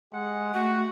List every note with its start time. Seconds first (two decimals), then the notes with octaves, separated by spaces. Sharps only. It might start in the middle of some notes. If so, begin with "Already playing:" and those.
0.12 G#3 G4 F#5
0.54 A3 F#4